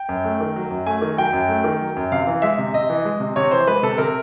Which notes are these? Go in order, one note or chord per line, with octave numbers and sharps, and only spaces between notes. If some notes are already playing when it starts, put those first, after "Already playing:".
Already playing: G5
F#2
A3
D#3
F#3
F#2
A3 G#5
D#3
F#3 G5
F#2
A3
D#3
F#3
F#2
C3 F5
E3
G#3 E5
C3
C3 D#5
E3
G#3
C3
C3 C#5
E3 C5
G#3 B4
C3 A4
C3 A#4